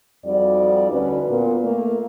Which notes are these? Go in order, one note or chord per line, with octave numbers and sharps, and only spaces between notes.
F2 G3 D#4 F#4 D5
D2 C#4 F#4 B4
A#2 B3
A3 A#3